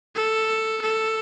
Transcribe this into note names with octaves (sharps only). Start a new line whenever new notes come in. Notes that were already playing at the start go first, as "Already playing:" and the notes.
A4
A4